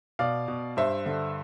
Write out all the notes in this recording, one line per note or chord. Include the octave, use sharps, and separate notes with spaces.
B2 D5 F5
B2
G2 C5 E5
D3